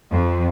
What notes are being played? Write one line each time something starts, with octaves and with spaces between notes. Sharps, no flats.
F2